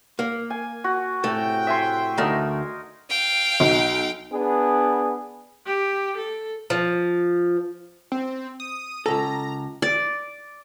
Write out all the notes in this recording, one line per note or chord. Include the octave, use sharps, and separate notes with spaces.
A#3
G#5
F#4
A2 C3 A3 G5
E5 G#5 C6
D2 A3 D#4 A#4
F5 G5
B1
B3 D4 G#4
G4
A4
F3
C4
D#6
C#2 A4 A#5
D5